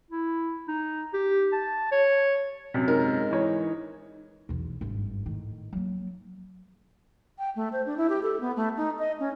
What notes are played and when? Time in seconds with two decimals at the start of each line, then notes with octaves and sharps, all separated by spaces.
0.11 E4
0.68 D#4
1.13 G4
1.53 A5
1.92 C#5
2.74 F#2 C3
2.88 G#2 D#4 A#4
3.31 E3 C#5
4.49 B1 E2
4.81 G#1 G2
5.26 A2 D#3
5.73 F#3 A#3
7.38 G5
7.55 A3
7.72 C5
7.86 D4
7.97 E4
8.09 G4
8.23 A4
8.40 B3
8.56 A3
8.77 D#4
8.99 D#5
9.19 C#4